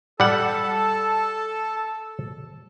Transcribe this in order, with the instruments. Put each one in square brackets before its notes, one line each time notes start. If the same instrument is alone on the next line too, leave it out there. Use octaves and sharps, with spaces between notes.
[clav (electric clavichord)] G3 F#5 [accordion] A4 A5